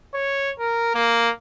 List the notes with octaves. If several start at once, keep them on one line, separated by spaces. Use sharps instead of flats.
C#5
A#4
A#3